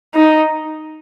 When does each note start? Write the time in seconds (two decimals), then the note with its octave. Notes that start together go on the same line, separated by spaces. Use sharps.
0.15 D#4